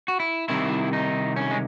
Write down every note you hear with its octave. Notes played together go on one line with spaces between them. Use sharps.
F#4
E4
C2 C3 D#3 E4
D#4
C#4
G#3